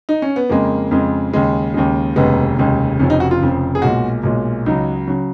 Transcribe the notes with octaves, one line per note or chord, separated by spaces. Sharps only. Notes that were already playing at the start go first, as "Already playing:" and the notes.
D#4
C#4
B3
F2 C#3 G#3 A#3
F2 C#3 G#3
D#2 C#3 G#3
D#2 C#3 G#3
F1 D#2 C#3 G#3 B3
F1 D#2 C#3 G#3
F1 F2 C#3 F3 C#4
D#4
F#4
F4
F1 F2 C#3 F3
G#4
B1 A#2 G#3 F#4
B1 A#2 G#3
C#2 C#3 F#3 D#4
C#3 F#3